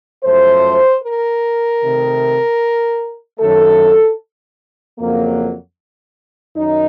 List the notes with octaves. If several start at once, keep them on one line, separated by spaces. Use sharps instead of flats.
F#2 F3 A3 C5
A#4
C3 D#3 A3
F#2 D#3 F#3 A3 A4
F2 C#3 F#3 A#3
F#2 D#3 D#4